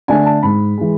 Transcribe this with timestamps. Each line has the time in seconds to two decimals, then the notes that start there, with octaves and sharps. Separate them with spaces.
0.08 D3 A3 D4 G#5
0.26 A5
0.43 G#2 B5
0.78 E3 G#3